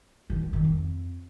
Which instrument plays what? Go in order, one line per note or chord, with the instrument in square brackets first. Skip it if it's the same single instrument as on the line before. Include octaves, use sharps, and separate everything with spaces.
[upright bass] D#3
D3
D#3
F2